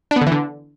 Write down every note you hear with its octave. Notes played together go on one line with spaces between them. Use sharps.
D4
B3
D3
E3
D3